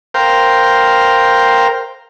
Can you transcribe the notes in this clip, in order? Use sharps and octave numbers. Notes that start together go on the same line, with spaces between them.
A#4 C5 F5 G5